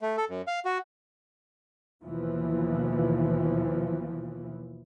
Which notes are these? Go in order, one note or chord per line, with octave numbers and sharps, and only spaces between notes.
A3
A4
F#2
F5
F#4
D#2 B2 E3 F3